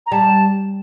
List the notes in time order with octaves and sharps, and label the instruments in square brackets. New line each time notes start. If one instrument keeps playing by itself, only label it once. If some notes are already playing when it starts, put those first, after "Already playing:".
[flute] A#5
[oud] G3 [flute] A5